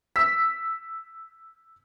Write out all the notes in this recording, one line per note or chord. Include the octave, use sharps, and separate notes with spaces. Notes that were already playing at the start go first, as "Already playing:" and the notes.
E6 B6